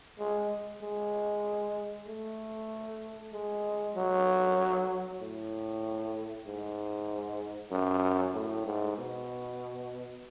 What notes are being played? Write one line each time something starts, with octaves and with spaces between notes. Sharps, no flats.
G#3
G#3
A3
G#3
F#3
A2
G#2
F#2
A2
G#2
B2